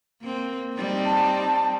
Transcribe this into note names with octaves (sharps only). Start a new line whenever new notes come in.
A#3 C4
G3 C4 D#4
A5